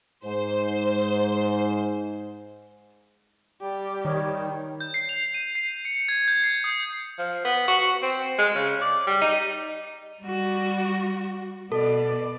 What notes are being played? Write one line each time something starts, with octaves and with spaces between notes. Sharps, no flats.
G#2 C5
G3 G4 D5
D#3 C#5
G6
C7
F7
D#7
C7
C#7
G#6
G6
C7
D#6
F3
B3
F#4
F#4
C4
G#3
C#3
D5
G3
D#4
G3 F#4
B2 A4 D5